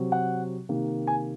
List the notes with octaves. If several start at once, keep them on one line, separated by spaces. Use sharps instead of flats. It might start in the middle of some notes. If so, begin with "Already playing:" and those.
Already playing: C3 F#3 C4
F#5
C3 D#3 A#3
G#5